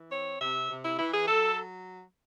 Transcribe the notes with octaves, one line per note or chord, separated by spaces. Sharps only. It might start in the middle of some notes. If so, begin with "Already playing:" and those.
Already playing: E3
C4 C#5
C3 E5
C3
E4
E3 E4
G#4
F#3 A4